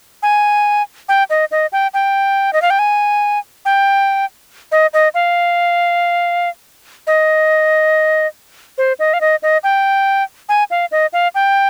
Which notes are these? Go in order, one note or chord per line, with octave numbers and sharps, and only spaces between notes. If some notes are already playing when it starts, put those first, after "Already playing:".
G#5
G5
D#5
D#5
G5
G5
D#5
F5
G5
G#5
G5
D#5
D#5
F5
D#5
C5
D#5
F5
D#5
D#5
G5
G#5
F5
D#5
F5
G5